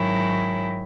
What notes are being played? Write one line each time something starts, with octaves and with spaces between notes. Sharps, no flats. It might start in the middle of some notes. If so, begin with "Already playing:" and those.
Already playing: G#2 D#3 F#3 C#4 E4